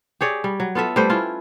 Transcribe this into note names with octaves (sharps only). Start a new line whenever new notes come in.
G4 G#4 C#5 D5
G3
F#3
B3 F4 A4 E5
G3 A3 B4 C5
C#4 E4 F4